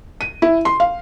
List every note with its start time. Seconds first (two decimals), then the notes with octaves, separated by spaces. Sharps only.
0.21 D#7
0.42 E4
0.65 C6
0.80 F5